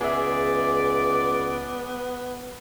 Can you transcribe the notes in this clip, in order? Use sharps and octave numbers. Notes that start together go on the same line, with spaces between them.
C#2 B3 G#4 D5 E5